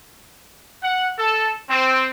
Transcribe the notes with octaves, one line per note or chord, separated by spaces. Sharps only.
F#5
A4
C4